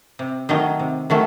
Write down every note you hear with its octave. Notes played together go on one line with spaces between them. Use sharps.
C3
D#3 F#3 A3 D#4
C3
D#3 F#3 A3